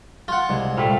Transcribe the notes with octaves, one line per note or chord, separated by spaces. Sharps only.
F4 F#5
C2 G#3
A#2 A3 F5 G5 B5